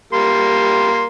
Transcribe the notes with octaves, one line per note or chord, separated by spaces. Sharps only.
G3 A#3 C6